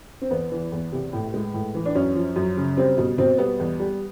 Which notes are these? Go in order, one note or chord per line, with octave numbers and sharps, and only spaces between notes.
C4
E2 B3
E3
E2
C3
A2
G#3
A2
E3
D4
F#2 C#4
F3
F#2
C#3
G3 C4
B2
B2 C4
G3 B3
E2
G3